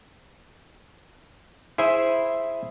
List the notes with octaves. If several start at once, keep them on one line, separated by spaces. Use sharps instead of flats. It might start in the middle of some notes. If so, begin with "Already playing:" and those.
E4 G#4 C5 E5